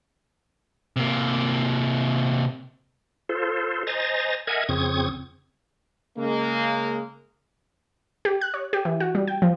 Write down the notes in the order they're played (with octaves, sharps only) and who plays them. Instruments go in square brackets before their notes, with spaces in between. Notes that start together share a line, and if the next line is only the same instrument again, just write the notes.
[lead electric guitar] C3 A#3
[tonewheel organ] F4 A4 C5
C5 D#5 G#5 A#5 A6
A#4 D#5 E5 F#5 G#5 G#6
F2 C#3 C4 C#6 D#6 G#6
[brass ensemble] C#3 G#3 A#3
[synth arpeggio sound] G4
F#6
C#5
G4
E3
F#4
G3
G5
F3